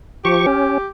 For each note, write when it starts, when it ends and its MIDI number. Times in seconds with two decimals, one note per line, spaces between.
0.25 0.46 53
0.25 0.88 67
0.25 0.46 85
0.46 0.78 61